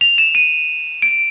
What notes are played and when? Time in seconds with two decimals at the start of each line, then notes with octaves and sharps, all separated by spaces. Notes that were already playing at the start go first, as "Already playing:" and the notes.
0.01 F7
0.18 E7
0.35 D#7
1.02 D7